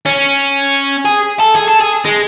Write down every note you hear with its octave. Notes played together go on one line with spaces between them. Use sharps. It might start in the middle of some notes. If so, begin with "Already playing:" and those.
C#4
G#4
A4
G#4
A4
G#4
G#3